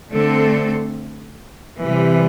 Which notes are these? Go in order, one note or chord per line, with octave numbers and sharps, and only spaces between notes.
D3 A3 C4 A4
C3 E3 G3